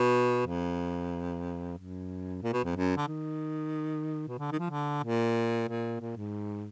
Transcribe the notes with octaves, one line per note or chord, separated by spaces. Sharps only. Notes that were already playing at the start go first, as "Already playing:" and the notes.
Already playing: B2
F2
F#2
A#2
B2
F2
F#2
D3
D#3
B2
D3
D#3
F3
D3
A#2
A#2
A#2
G#2